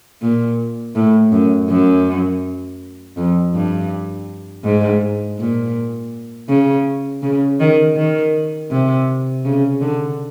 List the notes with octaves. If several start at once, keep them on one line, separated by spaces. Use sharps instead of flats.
A#2
A2
F#2
F#2
F2
G2
G#2
A#2
C#3
C#3
D#3
D#3
C3
C#3
D3